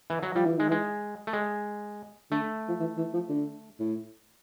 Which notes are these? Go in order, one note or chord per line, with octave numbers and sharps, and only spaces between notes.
E3
F#3
F3 G3
E3
D#3 G#3
E3
G#3
A3
G#3
D3 A3
F3
E3
E3
F3
D3
A2